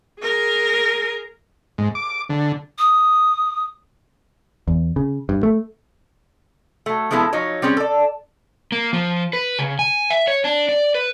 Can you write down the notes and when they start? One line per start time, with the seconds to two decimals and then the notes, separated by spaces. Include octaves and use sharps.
0.20 G#4 A#4
1.78 G#2
1.95 D6
2.30 D3
2.79 D#6
4.68 E2
4.96 C#3
5.29 G2
5.43 A3
6.86 F#3 A3
7.11 F3 G#3 B3 E4 G4 A4
7.33 F3 F#3 D#4 C#5
7.62 G3 C4 C#4 G#4
7.77 A4 D5
8.72 A#3
8.93 F3
9.33 B4
9.59 C#3
9.79 G#5
10.10 E5
10.28 C#5
10.44 D4
10.69 D5
10.95 B4